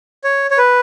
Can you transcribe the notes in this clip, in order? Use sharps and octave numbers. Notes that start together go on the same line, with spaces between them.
C#5
C#5
B4